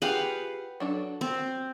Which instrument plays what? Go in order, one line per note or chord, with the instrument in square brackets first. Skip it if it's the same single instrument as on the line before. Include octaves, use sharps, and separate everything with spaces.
[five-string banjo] F4 G4 G#4 [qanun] B4 F5 F#5
[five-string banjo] F#3 D4 A4
[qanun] C4